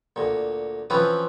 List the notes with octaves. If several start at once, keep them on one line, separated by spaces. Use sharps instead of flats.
D2 A#2
E3 F3 C4 C#4 F4 B4